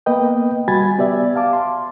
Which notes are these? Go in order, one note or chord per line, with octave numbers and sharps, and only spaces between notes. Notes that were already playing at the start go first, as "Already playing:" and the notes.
A#3 B3 B4 D#5 G5
G3 F#4 G#5 B5 G#6 A6
B3 G4 D5 E5
F5 A5 D6
C6